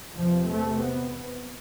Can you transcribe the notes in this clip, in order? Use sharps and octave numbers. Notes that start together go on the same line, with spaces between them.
E2 C3 F3
A3
B3